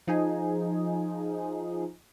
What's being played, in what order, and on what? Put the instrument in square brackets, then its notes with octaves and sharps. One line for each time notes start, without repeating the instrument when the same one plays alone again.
[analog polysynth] F3 D#4 G#4